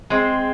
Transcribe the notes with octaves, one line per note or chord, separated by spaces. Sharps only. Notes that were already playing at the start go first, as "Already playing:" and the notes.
G#3 C4